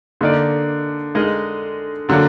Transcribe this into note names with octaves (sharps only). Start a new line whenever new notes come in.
D3 A#3 D#4 A#4 D5
G#3 D#4 A#4 D#5
D3 F#3 A#3 D4